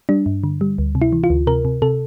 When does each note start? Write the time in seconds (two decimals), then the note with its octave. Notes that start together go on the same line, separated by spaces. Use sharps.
0.09 G3 D4
0.26 G2
0.44 D3
0.61 G3
0.78 D2
0.95 C3
1.02 E4
1.13 E3
1.24 F4
1.30 D2
1.47 C3 A#4
1.65 C3
1.82 C3 A4